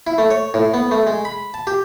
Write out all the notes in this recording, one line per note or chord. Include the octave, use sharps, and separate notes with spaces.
E4
A3
C#5
A2
B3
A3
G#3
B5
A5
G4